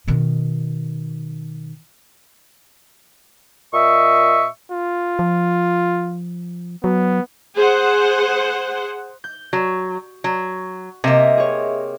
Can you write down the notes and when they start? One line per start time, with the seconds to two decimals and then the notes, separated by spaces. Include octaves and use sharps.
0.08 B2 D#3
3.74 A#2 D#5 E5 C#6
4.72 F4
5.19 F3
6.84 F#3 B3
7.55 G#4 C5 F#5
9.24 G6
9.53 F#3
10.24 F#3
11.04 C3 A#3 D#5 E5
11.37 G#4 C#5